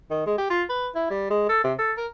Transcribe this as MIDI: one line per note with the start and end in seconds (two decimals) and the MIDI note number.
0.10 0.22 51
0.26 0.37 56
0.38 0.49 67
0.50 0.63 65
0.69 0.89 71
0.95 1.06 64
1.10 1.25 55
1.30 1.49 56
1.49 1.63 69
1.64 1.73 48
1.79 1.92 69
1.97 2.07 70